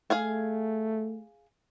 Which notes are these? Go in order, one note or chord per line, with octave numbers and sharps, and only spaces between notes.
A3 G#4 F5 G#5